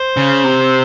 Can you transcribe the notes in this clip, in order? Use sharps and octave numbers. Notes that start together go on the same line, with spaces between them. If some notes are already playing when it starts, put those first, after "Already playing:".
Already playing: C5
C#3
C3